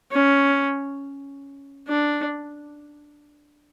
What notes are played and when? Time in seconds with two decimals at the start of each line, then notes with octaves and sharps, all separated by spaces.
0.12 C#4
1.88 D4